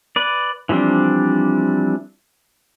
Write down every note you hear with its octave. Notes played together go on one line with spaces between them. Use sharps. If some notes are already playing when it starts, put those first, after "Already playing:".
B4 D5
E3 F3 G3 C4 D4